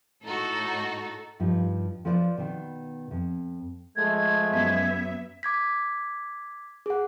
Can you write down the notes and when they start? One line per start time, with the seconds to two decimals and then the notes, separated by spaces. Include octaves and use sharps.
0.25 A2 D#4 F#4 A4
1.40 G2 F3 D#4
2.05 F3 B4 C5 D5
2.37 B2 D#3
3.11 F2
3.96 F3 G#3 A3 G#6
4.51 F#2 B3 E5
5.43 D6 G#6 B6
6.86 G#4 F#5